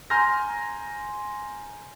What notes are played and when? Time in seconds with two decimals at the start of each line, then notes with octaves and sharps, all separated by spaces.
0.10 G#5 A#5 C6 F6 G6 A#6